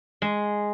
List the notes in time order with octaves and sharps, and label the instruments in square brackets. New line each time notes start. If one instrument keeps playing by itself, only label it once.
[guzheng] G#3